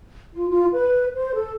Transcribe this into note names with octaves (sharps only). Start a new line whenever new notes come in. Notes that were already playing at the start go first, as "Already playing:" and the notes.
F4
F4
B4
C5
A4